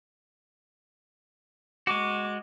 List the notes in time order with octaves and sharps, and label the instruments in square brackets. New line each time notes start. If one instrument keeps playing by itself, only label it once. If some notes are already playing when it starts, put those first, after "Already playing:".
[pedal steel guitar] G#3 F#4 [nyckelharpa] D6